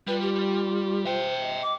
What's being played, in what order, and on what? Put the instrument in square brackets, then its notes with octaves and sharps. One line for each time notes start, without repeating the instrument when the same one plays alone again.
[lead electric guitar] G3 [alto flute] F4 [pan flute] B4
[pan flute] G4
[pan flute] C5 [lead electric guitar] E5 G5
[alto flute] D#5
[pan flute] D6